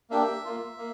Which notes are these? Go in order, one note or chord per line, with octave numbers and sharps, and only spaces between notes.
A#3 D4 G4 E5
A#3 F4
A#3